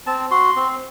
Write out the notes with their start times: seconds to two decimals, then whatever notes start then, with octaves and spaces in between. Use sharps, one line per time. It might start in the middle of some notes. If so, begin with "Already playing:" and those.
0.07 C4 A5
0.31 F#4 C6
0.56 C4